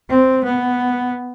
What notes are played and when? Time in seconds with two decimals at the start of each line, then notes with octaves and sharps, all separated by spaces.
0.10 C4
0.44 B3